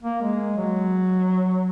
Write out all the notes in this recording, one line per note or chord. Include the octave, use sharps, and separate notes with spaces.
A#3
G#3
F#3